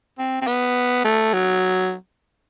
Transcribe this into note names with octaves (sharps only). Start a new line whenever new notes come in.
C4
C4
B3
A3
F#3